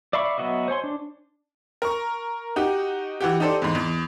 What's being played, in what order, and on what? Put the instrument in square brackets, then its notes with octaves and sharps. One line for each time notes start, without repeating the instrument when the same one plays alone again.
[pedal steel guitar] D5 E5 F5 B5 C#6
F#3 B3 F#4 D#5 E5
C5 C#5 G#5 C6
D4
[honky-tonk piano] A#4 A#5 C#6
D#4 F#4 G4
E3 F#4 G4
D#4 G4 A4 C5 D5
E2 G#2
E2